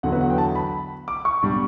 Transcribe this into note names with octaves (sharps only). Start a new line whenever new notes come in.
E2 D3 F#3 F#5
B4
F#5
G5
A5
B5
D6
C#6
B2 G3 D4